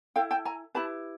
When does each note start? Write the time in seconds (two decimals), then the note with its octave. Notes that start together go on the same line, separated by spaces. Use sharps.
0.16 E4 A4 F5 G5
0.31 G5 A5
0.45 G#5 A#5
0.75 E4 G4 B4 A5 B5